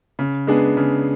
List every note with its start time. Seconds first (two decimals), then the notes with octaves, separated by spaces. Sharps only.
0.19 C#3
0.47 G#3 B3 D4 G#4
0.77 C#3